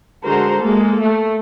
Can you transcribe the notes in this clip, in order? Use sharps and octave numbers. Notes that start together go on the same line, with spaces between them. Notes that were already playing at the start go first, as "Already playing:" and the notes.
D3 G#3 F#4 A#4 C5 A#5
G#3 A#3 A4
A3